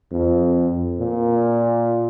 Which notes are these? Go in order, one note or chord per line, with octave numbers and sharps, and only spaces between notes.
F2
A#2